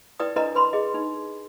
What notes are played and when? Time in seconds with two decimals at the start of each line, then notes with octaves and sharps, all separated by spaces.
0.20 E4 B4 D5 G5 D#6
0.36 D4 E4 A#4 B4 D#5 A#5
0.55 B4 B5 C6
0.73 G#4 D#5
0.94 D#4